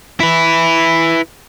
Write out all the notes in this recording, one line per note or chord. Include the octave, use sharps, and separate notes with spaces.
E4 B4